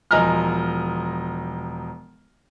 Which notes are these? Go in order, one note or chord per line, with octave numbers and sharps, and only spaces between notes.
E1 F3 D#5 G#5 A#5 F6